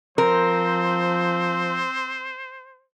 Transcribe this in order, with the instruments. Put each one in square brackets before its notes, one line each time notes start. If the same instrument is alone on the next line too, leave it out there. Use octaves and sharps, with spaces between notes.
[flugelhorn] F3 [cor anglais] C4 [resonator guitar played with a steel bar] A#4 [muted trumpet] C5